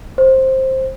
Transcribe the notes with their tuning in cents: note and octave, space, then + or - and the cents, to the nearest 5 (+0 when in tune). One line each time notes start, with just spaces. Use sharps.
C5 +10